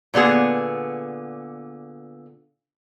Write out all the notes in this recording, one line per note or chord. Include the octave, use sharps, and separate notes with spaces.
A#2 D3 B3 G#4